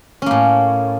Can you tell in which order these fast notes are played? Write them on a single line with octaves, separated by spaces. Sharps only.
C#4 A#3 A2